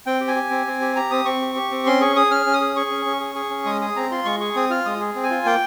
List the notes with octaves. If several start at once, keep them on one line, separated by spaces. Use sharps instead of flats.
C4 G5
G4
G#5
G4
C4
C4
G4
G4 A#5
C4 D#6
C4 C#6
G4
G4
C4
C#4 C6
G#4 C#6
G#4 D#6
C#4 F6
C#4
D#6
G#4
G#4 C#6
C#4
C#4
G#4
G#4
C#4
G#3 D#6
G#4 D#6
C4 A#5
F4 C6
G#3 C#6
G#4 C#6
C4 D#6
F4 F6
G#3 D#6
G#4
C4
G#5
F4
A#3 G5